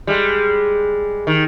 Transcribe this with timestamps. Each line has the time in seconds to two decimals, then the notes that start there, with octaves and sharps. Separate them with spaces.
0.07 G3 G#3
1.27 D#3